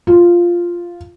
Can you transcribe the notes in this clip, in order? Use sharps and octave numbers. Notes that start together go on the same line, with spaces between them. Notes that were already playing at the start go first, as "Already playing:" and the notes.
F4